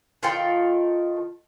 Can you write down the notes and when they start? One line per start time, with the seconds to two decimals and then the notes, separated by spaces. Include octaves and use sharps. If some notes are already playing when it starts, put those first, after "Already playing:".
0.23 D#3 F4 A4 G5